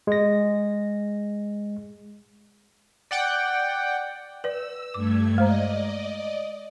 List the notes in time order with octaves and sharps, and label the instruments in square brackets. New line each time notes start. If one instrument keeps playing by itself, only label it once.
[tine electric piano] G#3 A#6
[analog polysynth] D5 F#5 G5
[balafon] B4 D5 [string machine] E6
[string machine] G2 A3 G#6 [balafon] D6
[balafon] G#3 C5 A#5 [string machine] D5 D#5